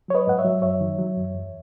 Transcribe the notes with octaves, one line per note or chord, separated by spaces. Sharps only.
F#3 C#5
B4 D#5
G#2 F#5
C#5 E5
F#3
F#2 C#5 E5
D#3
F#3
F#2
E2